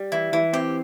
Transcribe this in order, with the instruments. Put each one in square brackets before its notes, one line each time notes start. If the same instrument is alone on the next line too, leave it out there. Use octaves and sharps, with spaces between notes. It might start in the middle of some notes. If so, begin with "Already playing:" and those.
Already playing: [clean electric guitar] G3
[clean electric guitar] E3 [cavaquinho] E4
[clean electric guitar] E3 [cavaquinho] E4
[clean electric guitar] C4 [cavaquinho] G4